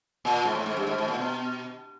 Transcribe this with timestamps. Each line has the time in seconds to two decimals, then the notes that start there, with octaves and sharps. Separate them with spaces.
0.25 A#2
0.45 G#2
0.55 A2
0.66 G#2
0.77 G2
0.87 G#2
0.98 G#2
1.08 A#2
1.18 B2